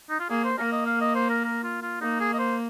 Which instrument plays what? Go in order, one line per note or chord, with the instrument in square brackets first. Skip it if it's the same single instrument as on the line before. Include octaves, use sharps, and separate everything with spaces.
[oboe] D#4
F4
[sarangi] A#3 [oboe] G#4
[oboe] C5
[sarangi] A#3 [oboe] A#4
[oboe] D#5
F5
D#5
C5
A#4
A#4
F4
F4
[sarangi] A#3 [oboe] D#4
[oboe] G#4
D#5
C5